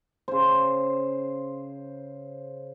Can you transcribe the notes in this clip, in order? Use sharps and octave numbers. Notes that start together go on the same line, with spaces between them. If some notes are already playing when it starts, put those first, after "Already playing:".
C#3 C5